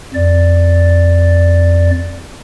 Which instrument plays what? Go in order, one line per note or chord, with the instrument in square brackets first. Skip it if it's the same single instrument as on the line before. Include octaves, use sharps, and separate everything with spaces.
[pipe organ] F2 D5